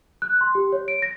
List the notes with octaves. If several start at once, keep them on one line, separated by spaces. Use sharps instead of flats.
F#6
C6
G4
C#5
D7
A#6